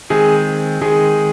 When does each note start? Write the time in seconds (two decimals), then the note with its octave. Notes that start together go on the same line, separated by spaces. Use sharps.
0.10 D#3 G#3 C4 G#4
0.81 D#3 G#3 C4 G#4